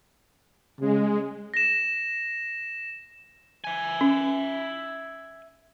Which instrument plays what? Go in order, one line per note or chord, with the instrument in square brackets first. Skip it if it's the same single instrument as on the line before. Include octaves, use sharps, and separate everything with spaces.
[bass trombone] C#3 [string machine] G#3
[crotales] A#6 E7
[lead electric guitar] E5 G#5
[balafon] C#4